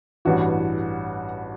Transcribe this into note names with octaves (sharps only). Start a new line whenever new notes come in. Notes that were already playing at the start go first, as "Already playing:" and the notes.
A1 G2 E3 F#4